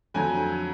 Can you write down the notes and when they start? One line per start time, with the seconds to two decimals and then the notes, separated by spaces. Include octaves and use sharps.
0.14 F2 D3 F#3 G#5